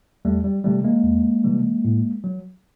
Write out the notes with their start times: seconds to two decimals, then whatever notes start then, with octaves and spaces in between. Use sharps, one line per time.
0.25 E2 G3 A3
0.44 G3
0.64 C3 E3 G3 A3
0.84 G#3 A#3
1.04 E2
1.44 C3 E3 G3
1.85 A2
2.24 F#3